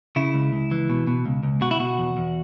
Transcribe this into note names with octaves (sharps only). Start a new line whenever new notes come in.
C#3 E4
C#2
C#2
E3
B2
B2
C#2
C#2
B2 F#4
E4
B2 F#4
E2
E2